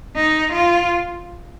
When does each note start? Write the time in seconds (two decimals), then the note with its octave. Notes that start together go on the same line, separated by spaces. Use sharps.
0.16 D#4
0.53 F4